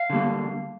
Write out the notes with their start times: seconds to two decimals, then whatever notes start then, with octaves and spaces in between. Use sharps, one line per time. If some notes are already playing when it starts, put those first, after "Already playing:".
Already playing: F5
0.10 D3 G3 A#3